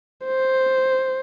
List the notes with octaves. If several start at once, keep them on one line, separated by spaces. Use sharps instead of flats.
C5